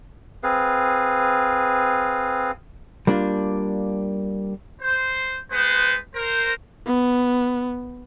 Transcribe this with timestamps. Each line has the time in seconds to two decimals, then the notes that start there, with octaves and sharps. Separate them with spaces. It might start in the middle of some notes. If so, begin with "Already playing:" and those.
0.43 C4 G#4 B4 F5
3.07 G3 A#3 D4 F4
4.82 C5
5.52 G#3 B3 B4 C5
6.16 A#4 C5
6.87 B3